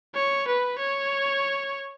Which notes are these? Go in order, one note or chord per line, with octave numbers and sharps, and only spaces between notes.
C#5
B4
C#5